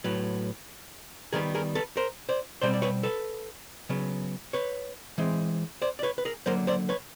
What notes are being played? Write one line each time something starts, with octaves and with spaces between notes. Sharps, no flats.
A2 F#3 B3
D#3 G3 B3 G#4 A#4
G#4 A#4
A4 B4
A#4 C5
C5 D5
B2 G3 C4 C5 D5
D5
B4 C#5
A4 B4
C#3 F#3 B3
B4 C#5
E3 G#3 C4
C5 D5
D5
B4 C#5
B4
G#4 A#4
D3 F#3 A#3 A#4 C5
C5 D5
B4 C#5